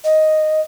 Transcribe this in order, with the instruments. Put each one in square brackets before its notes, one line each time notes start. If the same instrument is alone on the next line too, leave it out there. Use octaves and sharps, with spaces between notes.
[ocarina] D#5